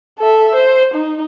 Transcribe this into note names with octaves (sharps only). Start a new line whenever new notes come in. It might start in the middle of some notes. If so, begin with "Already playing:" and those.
A4 E5
C5
D#4